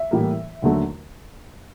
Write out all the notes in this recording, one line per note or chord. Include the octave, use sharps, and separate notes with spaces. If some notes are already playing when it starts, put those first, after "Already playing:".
Already playing: E5
A2 E3 G3 A#3
D#2 D3 F#3 A3